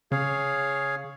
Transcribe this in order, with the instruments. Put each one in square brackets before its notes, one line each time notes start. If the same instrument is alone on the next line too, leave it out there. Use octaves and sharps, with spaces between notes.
[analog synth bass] C#3 [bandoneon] G#4 C#5 F5